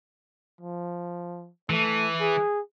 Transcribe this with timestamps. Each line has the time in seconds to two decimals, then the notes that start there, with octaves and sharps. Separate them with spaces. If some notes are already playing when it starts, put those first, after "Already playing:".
0.61 F3
1.70 E3 A3
2.20 G#4